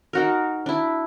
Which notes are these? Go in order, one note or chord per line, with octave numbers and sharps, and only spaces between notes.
D#4 F#4 A#4
D4 E4